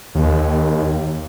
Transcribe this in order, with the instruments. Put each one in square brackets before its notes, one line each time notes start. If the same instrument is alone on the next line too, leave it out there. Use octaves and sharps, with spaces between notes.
[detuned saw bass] D#2